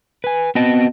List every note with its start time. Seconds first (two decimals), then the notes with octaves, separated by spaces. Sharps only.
0.24 B4 G#5
0.55 B3 C4 F#4 D#5 A5